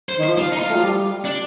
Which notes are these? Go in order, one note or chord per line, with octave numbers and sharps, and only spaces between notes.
C5
D#3
C5
F3
G3 F4
A#3 D#4
F4
A3
F3
G3
D4